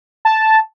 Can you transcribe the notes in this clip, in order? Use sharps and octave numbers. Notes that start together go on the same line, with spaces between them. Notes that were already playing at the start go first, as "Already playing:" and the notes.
A5